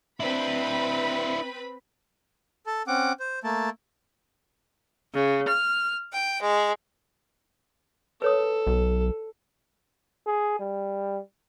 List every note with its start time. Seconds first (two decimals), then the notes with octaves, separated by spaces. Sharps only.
0.20 C4 D4 E4 B4 B5
2.66 A4 A5
2.87 C4 C#4 F#5 D6
3.20 C5
3.44 A3 A#3 A5
5.14 C#3
5.48 F6
6.12 G5
6.41 G#3
8.22 A4 B4 C#5 D#6
8.67 B1
10.27 G#4
10.60 G3